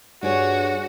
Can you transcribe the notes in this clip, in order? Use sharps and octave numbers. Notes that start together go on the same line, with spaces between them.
G2 D4 F#4 G#4 C#5